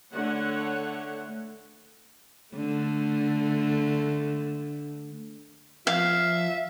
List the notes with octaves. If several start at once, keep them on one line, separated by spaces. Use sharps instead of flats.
D3 A3 C#5 F#5
D3 A3
F3 E5 F5